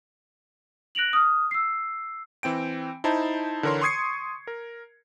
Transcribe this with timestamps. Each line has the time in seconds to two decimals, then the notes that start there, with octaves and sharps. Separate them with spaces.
0.95 F#6 A#6 D7 F7 F#7
1.13 D#6 F6
1.51 E6 C7
2.43 E3 C4 G5 D7
3.04 D#4 E4 C5 A5
3.63 D3 E3 A#4 C#5 C6
3.81 C6 C#6 D#6 G#6 C7 C#7
4.47 A#4